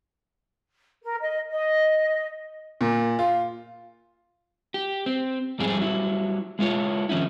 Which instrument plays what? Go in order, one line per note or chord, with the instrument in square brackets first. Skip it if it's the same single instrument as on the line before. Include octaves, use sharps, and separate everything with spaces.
[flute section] A#4
D#5
D#5
[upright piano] A#2
F4
[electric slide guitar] G4
C4
F2 G#2 G3 C4 G#4
F#3 G3 E4
G#3 E4 F4 C#5
D#3 F3 C#4 D#4 E4